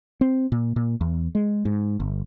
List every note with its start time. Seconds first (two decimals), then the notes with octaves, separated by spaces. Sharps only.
0.21 C4
0.52 A#2
0.76 A#2
1.01 E2
1.35 G#3
1.65 G#2
2.00 G1